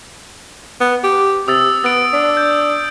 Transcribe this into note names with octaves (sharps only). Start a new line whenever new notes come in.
B3
G4
C3 D#6 E6 A6
B3 A6 D7
D4
G6